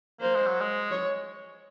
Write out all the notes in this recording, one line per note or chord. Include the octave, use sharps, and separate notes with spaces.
A#3 C5
G#3
F#3
G#3
C#5